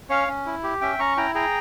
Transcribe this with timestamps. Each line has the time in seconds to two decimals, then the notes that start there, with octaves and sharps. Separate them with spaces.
0.10 C#4 C#5 F5
0.28 C#4
0.46 E4
0.64 G4
0.81 C#4 E5 G5
0.99 C#4 A#5 C#6
1.17 E4 G5 A#5
1.35 G#4 G5 A#5